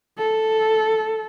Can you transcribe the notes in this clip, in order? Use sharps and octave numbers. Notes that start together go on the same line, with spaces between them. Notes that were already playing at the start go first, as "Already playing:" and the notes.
A4